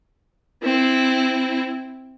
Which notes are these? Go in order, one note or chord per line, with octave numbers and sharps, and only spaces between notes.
C4 E4